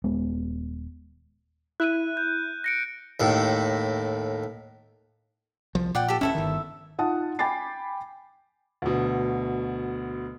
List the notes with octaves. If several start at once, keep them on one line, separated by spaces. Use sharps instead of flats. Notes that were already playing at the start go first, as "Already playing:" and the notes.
D#1 G#3 B3
E4 F#6 D#7
G6
A#6 C#7 D7
D#2 A2
C2 F3
A#2 D5 F#5 G5
G4 A4
D1 F2 C#4 E4 A4 E5
G1 D#3
D#4 F4 F#5 A5 D#6
G5 G#5 B5 D6 A6 C7
D2 B2